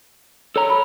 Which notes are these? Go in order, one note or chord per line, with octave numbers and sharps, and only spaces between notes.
A4 C#5 A#5
B5